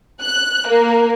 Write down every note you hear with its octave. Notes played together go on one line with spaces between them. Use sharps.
F#6
A#3